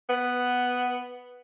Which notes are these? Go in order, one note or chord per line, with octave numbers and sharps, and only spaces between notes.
B3